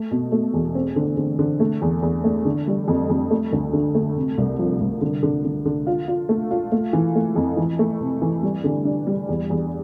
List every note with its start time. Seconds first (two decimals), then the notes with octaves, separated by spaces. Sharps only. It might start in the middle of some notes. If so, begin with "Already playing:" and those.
Already playing: A3
0.11 B2
0.32 A3
0.54 E2
0.75 C4
0.96 D3
1.17 D3
1.39 D3
1.60 A3
1.82 E2
2.02 E2
2.24 A3
2.45 D3
2.67 G3
2.88 F2
3.09 F2
3.31 A3
3.53 D2
3.73 D3
3.95 A3
4.16 C3
4.38 C2
4.59 F3
4.80 C2
5.01 D3
5.23 D3
5.45 D3
5.65 D3
5.87 F4
6.08 F4
6.29 A3
6.51 F4
6.72 A3
6.93 E3
7.15 A3
7.36 F2
7.57 E3
7.79 A3
8.00 C3
8.22 E3
8.43 G3
8.64 D3
8.85 D4
9.07 G3
9.29 E2
9.50 E2